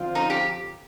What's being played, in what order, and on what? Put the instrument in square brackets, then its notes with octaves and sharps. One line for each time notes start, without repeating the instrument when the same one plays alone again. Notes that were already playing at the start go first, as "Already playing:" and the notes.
Already playing: [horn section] D3 F3 C4 F4
[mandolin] D#4
G4